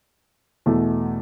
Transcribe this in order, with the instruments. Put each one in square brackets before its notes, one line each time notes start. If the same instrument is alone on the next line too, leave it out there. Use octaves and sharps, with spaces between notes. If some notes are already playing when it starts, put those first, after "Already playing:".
[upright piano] E2 B2 A3